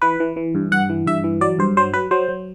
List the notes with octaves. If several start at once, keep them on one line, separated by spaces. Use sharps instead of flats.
E3 B4
E3
E3
G2
G2 F#5
E3
G2 E5
E3
F#3 D5
G2 C5
F#3 C5
F#3 B4
F#3 C5
F#3